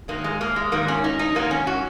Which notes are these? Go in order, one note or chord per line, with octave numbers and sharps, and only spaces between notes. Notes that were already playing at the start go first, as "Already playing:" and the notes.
G#2 D#3 F#3 A#3
G#3
A#3
G#3
G#2 D#3 F#3 A#3
C#4
D#4
D#4
G#2 D#3 F#3 A#3
C#4
F#4